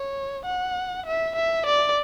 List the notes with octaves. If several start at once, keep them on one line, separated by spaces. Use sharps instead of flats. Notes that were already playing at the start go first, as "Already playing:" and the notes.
Already playing: C#5
F#5
E5
E5
D5